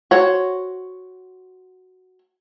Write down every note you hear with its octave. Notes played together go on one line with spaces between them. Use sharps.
F#4 C5 C#5